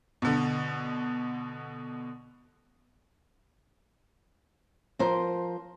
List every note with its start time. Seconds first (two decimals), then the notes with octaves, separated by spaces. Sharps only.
0.22 B2 D3
4.99 F3 A#4 C5